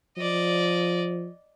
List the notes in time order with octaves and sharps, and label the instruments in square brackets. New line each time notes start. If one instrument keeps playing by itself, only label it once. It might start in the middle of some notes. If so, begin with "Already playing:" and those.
[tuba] F3 [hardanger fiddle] D5 D#5